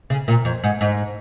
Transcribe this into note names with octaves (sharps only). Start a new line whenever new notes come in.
C#3
A#2
F2
G#2
G#2